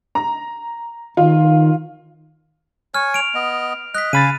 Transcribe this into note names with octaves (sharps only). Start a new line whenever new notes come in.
A#5
D#3 F4
C#5 G#5 F6
D7 F7
B3 D#5
D#5 F#6 B6
C#3 F5 G#5 B5 A6 D#7